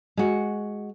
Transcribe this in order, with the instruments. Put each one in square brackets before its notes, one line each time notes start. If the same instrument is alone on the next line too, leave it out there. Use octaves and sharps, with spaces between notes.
[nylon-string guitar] G#3 F#4